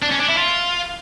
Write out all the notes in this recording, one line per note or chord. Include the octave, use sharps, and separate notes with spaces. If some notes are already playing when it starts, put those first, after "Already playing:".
D4
C#4
D4
E4
F4